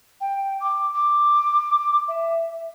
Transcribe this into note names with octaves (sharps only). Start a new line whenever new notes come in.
G5
D6
D6
E5